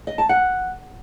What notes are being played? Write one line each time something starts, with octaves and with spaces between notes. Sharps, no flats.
D#5
A5
F#5